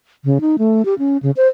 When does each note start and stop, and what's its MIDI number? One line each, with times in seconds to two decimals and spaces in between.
0.24 0.38 49
0.41 0.56 63
0.59 0.85 57
0.85 0.94 67
0.99 1.17 61
1.23 1.31 49
1.37 1.47 72